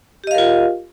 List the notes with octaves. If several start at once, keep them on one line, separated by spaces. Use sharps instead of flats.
F4 G4 A#4 D#5 F5